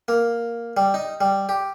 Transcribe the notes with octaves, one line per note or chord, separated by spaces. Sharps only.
A#3
G3
D#4
G3
G4